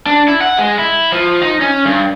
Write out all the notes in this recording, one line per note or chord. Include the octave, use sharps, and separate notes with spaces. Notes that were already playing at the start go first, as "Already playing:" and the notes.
D4
E4
F#5
G#3
E4
F3
D#4
C#4
G2